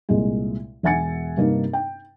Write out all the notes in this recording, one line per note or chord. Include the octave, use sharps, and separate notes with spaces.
C2 A#2 G#3
E1 E5 F#5 G#5 A6 C#7
G2 C3 A#3 D#4
G5